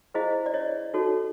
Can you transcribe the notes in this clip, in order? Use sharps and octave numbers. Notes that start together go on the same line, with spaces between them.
E4 G#4 C5 D#5 F5
D5
C#5 D#5
D#4 F#4 A4 C#5